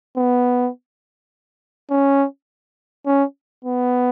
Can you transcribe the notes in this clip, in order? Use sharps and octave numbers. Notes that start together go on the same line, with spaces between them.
B3
C#4
C#4
B3